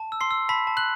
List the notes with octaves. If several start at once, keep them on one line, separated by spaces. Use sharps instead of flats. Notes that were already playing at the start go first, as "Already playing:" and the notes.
Already playing: A5
E6
C6 C7
E6
A5 B5 B6
A5
F#6 F#7